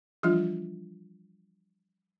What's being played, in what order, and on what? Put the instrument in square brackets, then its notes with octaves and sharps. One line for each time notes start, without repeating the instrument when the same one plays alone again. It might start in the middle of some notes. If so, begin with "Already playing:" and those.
[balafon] E3 F3 G3 D4 F4